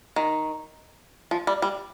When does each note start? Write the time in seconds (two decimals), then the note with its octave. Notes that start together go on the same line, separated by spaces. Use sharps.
0.16 D#3
1.31 F3
1.47 G3
1.62 G3